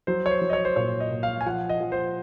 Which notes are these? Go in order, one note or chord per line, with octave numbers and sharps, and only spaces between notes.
F#3 C5
C#5
C5
F#3
D#5
C#5
C5
A#2 C#5
D#5
A#2
F5
G#5
F3 F#5
D#5
F3
C5